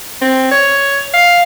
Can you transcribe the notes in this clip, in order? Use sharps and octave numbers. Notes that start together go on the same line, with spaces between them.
C4
C#5
F5